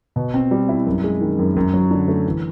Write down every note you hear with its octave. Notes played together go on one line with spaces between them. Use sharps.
B2
C4
G3
E4
F#2
G#3
D#3
F#2
F#2
F#3
D3
A3
E3